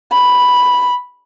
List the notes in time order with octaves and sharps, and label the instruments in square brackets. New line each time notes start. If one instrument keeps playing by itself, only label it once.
[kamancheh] B5